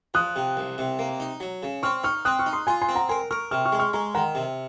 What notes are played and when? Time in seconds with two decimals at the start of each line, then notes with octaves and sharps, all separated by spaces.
0.14 F3 D#6 F#6
0.36 C3
0.57 C2
0.78 C3
0.99 A#3
1.20 D#4
1.40 F#3
1.63 C#3
1.83 C4 C#6 F6
2.04 D#4 C#6 F6
2.25 C4 D#6 F#6
2.39 C#6 F6
2.46 D#4
2.53 C6 D#6
2.67 F4 G#5 C6
2.82 G#5 C6
2.89 C4
2.95 F#5 A#5
3.09 A#4 G#5 C6
3.31 A#4 C#6 F6
3.51 C3 C#6 F6
3.65 C#6 F6
3.72 G#3
3.79 C#6 F6
3.93 G#3 A#5 C#6
4.15 D#3 F#5 A#5
4.35 C3